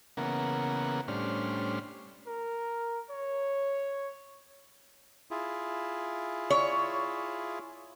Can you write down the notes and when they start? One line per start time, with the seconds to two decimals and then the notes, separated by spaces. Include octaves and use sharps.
0.17 C#3 E3 A#3 B3 A#4 F#5
1.08 A2 G3 C#4 D4 C5 F6
2.27 A#4
3.10 C#5
5.31 E4 F4 G#4
6.50 C#5